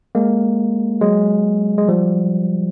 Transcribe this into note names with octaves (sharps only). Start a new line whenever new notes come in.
G#3 A#3
F#3 G#3
G#3
F3 G3